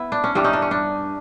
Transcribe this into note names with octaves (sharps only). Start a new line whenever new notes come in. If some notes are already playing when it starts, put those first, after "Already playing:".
Already playing: B3 E4
D4
C#4
G2 E3 G3 D4
C#4 D#4
D4
C#4
D4